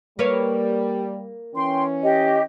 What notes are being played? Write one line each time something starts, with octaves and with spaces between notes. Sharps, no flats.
G3 A#3 B4 C#5
E3 C#4 G5 C6
G4 D#5